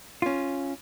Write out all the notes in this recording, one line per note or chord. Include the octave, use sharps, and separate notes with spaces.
C#4 F4